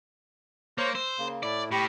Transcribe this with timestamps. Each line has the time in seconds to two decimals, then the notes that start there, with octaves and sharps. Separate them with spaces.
0.78 A#3 C5 C#5 C#6
0.95 C5 E6
1.19 C#3 A#3
1.43 A2 A3 E4 D5
1.71 A2 G4 B5 C#6